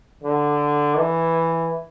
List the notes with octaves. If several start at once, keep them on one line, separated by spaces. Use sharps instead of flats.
D3
E3